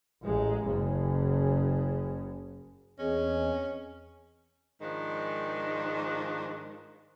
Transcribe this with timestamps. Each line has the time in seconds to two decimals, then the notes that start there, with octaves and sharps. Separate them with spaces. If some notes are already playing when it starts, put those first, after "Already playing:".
0.23 A1 G#3
0.65 F#1 C#3
2.99 E2 E3 C4 C#4 G#4 D#5
4.82 G#2 D#3 F3 D4